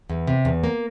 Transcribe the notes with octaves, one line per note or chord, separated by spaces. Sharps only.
E2
C3
E2
A#3